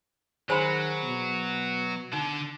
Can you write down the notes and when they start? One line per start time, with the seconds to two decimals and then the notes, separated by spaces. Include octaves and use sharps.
0.50 D#3 F#3 G#4 C5 C#5 G#5 B5 C6
1.03 B2
2.13 D3 D#4